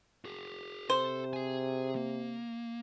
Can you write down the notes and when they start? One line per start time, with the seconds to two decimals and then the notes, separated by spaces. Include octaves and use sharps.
0.25 F#4 G#4
0.90 C3 A4 C5
1.33 G#4 G#5
1.96 A#3